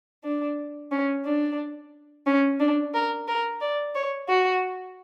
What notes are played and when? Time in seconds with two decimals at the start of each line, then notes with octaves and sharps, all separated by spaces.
0.24 D4
0.92 C#4
1.25 D4
2.27 C#4
2.60 D4
2.94 A#4
3.28 A#4
3.61 D5
3.95 C#5
4.29 F#4